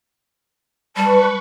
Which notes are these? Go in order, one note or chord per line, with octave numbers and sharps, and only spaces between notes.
G3 B4 A5 C#6